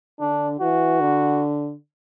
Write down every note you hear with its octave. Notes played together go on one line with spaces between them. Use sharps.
D3 D4
E3 F#4
D3